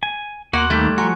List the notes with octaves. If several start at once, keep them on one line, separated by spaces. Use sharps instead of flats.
G#5
D#2 A#3 F#4 F#5 C6 F#6
D#3 G3 A3 A#3 G#6
F3 F#4 G#5 A#5 C6 C#6 F#6 C#7